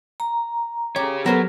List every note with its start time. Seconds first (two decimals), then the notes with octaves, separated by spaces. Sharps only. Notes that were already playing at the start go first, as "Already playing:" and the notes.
0.20 A#5
0.96 G4 G#4 C#5
1.26 F#3 B3 A#4 C5 C6